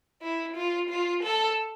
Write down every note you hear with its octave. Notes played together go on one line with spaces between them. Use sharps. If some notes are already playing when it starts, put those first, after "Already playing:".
E4
F4
F4
A4